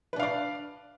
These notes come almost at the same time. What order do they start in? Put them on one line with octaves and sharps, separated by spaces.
B4 D4 F5 D5